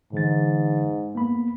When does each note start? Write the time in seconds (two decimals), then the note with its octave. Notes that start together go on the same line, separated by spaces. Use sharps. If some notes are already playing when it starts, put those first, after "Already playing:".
0.13 G#2 D3 E3 A6
1.15 A#3 B3 B5